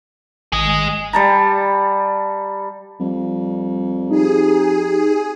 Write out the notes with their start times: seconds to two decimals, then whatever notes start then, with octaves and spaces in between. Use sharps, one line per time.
0.52 G#1 G#4 D#5
1.13 G3 A5 A#5
3.00 F2 G3
4.11 D#4 G4 G#4